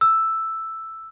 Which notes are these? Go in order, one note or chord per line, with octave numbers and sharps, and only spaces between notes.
E6